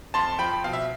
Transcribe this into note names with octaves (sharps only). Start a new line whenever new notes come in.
F2 A5 C6
F3 G5 B5
B2 F5
E5